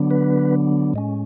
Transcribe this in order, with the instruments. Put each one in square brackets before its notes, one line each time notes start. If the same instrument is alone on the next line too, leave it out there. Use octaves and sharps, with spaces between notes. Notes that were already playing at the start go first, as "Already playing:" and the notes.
Already playing: [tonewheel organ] D3 F#3 B3 D4
B4
A2 G#3 C#4